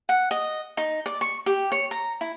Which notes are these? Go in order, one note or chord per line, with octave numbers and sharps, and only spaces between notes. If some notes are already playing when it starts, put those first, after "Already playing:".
F#5
D#5
D#4
D5
C#6
G4
C#5
A#5
E4